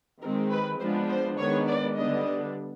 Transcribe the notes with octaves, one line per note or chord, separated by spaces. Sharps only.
D#3 G#3 C4 A#4
B4
F3 G#3 B3 D4 C5
C5
D#3 G#3 B3 D4 C#5
D5
D3 G3 B3 D4 D#5